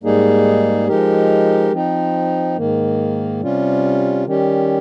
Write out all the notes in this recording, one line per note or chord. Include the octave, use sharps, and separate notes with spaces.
G#2 G3 A#3 D#4 G#4
F3 G#3 D#4 G4 A#4
F3 C4 D#4
G#2 D#3 A#3
C3 G3 C#4 F4
D#3 G3 C#4 G4